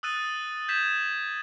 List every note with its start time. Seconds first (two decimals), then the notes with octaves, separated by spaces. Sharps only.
0.03 D#6 E6 F#6 A6 D#7
0.69 G6 G#6 B6 E7